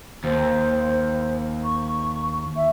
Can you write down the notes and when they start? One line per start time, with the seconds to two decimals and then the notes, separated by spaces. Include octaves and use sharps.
0.24 D#2 C5
1.64 C#6
2.56 E5